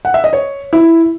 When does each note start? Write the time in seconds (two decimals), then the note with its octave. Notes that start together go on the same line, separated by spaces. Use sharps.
0.05 F#5
0.14 E5
0.24 D#5
0.33 C#5
0.73 E4